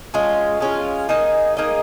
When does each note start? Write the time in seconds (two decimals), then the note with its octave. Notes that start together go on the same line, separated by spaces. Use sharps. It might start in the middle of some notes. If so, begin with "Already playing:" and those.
0.14 G#3 C#4 F4
0.61 G#3 C#4 F4
1.09 A#3 D#4 G#4 D#5
1.57 A#3 D#4 G#4 D#5